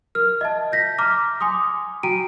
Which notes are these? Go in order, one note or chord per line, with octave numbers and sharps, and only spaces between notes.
A#4 F6
D#5 E5 A5
G6 A#6 B6
A#5 D6 F6
G#5 C6 D6 D#6
F#4 G5 A#5 D7 D#7